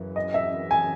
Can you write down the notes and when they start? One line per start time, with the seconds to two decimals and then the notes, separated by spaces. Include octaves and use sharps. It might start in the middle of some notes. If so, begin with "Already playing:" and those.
Already playing: F#2 C#3 E3
0.16 D#5
0.34 E5
0.71 G#5